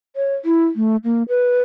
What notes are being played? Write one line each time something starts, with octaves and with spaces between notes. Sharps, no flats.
C#5
E4
A3
A#3
B4